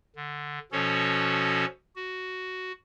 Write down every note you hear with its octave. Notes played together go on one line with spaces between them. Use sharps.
D3
B2 F3 C#4 F#4 A4 C#5
F#4